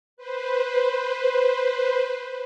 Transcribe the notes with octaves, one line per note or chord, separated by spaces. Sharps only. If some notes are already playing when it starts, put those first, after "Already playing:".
B4 C5